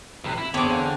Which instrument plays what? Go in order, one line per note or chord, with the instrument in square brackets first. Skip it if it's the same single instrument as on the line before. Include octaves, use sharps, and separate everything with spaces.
[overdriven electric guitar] B1 C3 [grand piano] B5 F#6
[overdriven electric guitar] E4
[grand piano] F#1 B3 [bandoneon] E2 C4 [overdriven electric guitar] D3 [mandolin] C#5 D6
[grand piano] C5 F5 G#5